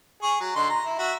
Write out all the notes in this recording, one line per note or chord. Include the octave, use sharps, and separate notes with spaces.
G#4 C#6
F#3
D3 D#4 C6
A#5
E4
F#4 E5